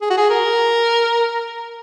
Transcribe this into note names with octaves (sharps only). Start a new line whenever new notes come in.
G#4
F#4
G#4
A#4